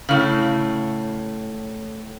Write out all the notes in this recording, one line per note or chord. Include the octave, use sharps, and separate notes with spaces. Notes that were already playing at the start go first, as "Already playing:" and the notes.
A2 C#3